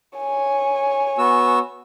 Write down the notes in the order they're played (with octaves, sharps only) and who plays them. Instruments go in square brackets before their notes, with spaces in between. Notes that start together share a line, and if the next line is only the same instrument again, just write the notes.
[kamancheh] C#5 G#5
[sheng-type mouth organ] B3 F#4 E6